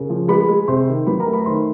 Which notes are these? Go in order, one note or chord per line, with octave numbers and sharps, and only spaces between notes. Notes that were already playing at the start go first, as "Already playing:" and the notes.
Already playing: C#3 A#4
F3
G#3 B4 B5
G#3
C3 C5 C6
D#3
F#3 B4 B5
A#4 A#5
A3
B4 B5
D#3 C5 C6